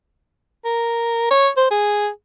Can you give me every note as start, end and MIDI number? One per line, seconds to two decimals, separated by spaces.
0.65 1.30 70
1.31 1.48 73
1.57 1.66 72
1.71 2.08 68